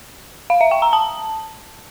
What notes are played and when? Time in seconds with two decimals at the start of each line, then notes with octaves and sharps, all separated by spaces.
0.50 F5
0.61 E5
0.71 G5
0.82 A#5
0.93 A5